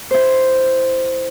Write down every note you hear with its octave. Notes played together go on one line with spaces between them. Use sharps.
E4 C5